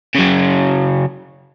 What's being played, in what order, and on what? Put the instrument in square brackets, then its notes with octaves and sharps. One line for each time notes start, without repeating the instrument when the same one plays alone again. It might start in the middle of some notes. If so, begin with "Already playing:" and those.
[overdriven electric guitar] C#3 F#3